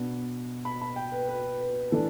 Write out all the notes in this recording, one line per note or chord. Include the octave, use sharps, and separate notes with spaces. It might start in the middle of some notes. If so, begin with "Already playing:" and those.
Already playing: B2 B3 D4
B5
B5
G5
B4
B4
B4
E3 A3 D4 A4